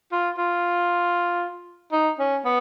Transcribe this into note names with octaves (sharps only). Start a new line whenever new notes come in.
F4
F4
D#4
C#4
B3